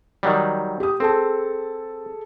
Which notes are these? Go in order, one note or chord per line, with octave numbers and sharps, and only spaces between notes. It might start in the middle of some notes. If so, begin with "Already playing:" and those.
D#3 F#3 G3
G4 D#6
C4 G#4 A4 A5